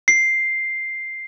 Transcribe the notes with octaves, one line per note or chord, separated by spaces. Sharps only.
C7